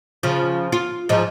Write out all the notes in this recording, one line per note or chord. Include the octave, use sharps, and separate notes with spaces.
C#3 F3
F4
G#2 F3